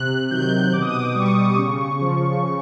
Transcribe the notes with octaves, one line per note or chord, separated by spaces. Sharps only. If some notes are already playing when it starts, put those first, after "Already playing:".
Already playing: C3 F#6
D#3 F#3 G6
B2 D6
D#6
D6
G3 C#6
C#3
F3
C#3